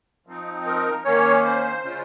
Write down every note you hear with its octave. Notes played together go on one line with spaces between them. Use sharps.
F3 C4 D#4
A#4
D#3 A#3 C#4 C#5
C5
C#3 G#3 C#4 F4